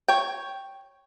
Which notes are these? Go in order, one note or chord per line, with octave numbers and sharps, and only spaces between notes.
C#5 G5